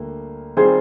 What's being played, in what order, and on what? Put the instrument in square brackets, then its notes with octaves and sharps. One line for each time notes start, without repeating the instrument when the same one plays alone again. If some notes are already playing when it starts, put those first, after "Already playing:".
Already playing: [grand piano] D2 D3 G3 A#3
[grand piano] D#3 G3 C4 F4 [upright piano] G#4 C5